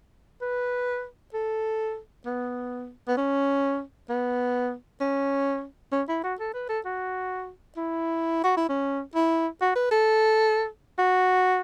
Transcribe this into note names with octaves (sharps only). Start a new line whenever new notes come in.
B4
A4
B3
B3
C#4
B3
C#4
C#4
E4
F#4
A4
B4
A4
F#4
E4
F#4
E4
C#4
E4
F#4
B4
A4
F#4